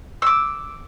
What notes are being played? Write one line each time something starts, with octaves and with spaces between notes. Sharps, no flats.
D6 E6